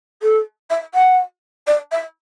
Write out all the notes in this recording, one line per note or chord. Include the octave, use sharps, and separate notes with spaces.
A4
E5
F#5
D5
E5